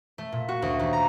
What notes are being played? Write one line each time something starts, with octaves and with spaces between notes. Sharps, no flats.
A3
A#2
F#4
D2
D#2
A#5